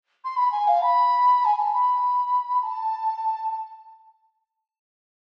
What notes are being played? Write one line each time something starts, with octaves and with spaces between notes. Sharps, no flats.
C6
B5
G#5
F5
B5
G#5
A5
B5
A5